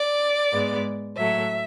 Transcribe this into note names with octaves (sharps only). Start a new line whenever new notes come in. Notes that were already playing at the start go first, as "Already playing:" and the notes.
Already playing: D5
G#2 G#3 B3
A2 F#3 A3 E5